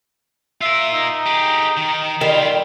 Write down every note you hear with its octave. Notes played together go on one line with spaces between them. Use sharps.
F4 A#4 E5
D#4
G4 G#4
D#3
D#3 G3 E4 F4